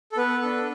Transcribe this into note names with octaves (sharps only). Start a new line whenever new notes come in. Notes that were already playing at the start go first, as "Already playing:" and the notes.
A4
B3 B4
D4 A4